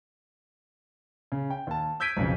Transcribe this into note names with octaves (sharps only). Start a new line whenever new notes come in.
C#3
G5
D#2 A5
E6 G6 G#6 B6 D7 D#7
B1 F2 C#3